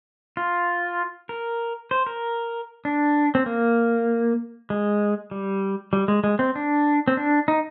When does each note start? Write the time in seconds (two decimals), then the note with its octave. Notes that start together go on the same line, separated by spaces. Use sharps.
0.37 F4
1.29 A#4
1.91 C5
2.07 A#4
2.85 D4
3.35 C4
3.46 A#3
4.70 G#3
5.31 G3
5.93 G3
6.08 G#3
6.24 G#3
6.39 C4
6.56 D4
7.08 C4
7.17 D4
7.48 D#4